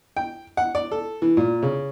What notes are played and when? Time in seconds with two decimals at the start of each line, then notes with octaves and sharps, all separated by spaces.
0.17 G5
0.57 F#5
0.75 D5
0.92 A4
1.22 E3
1.37 A#2
1.63 C#3